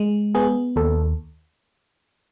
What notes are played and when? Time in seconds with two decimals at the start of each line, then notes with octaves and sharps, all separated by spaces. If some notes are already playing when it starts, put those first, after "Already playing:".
Already playing: G#3
0.35 B3 G#4
0.76 D#2 A4